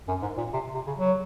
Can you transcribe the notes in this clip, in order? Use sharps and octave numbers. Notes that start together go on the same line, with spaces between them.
F#2
G#2
A#2
C3
C3
C#3
F#3